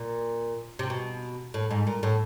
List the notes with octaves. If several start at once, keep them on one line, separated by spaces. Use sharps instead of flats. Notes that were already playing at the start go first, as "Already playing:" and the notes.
Already playing: A#2
C3
B2
A2
G#2
A#2
A2